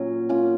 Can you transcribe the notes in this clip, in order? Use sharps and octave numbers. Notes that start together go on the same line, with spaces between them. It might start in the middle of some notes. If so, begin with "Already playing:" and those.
Already playing: A#2 F#3 C#4
A#3 C#4 F4